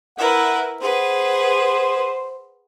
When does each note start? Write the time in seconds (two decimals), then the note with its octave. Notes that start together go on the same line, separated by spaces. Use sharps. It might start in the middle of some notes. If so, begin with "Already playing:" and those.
0.18 E4 A#4 B4 F#5
0.82 G#4 B4 C5 F#5